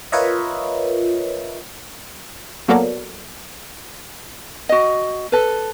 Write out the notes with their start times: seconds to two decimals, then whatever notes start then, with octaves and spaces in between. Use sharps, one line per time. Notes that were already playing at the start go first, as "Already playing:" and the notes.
0.12 F4 A#4 B4 C#5 D#5 E5
2.68 F#3 A#3 B3 A4 A#4 D5
4.69 F#4 D#5
5.32 A4 B4